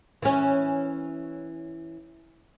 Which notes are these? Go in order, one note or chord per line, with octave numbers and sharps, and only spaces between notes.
E3 C#4